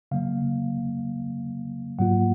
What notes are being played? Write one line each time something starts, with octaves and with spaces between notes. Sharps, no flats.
C#3 F#3 A#3 F5
G#2 F#3 A#3 F4 F#5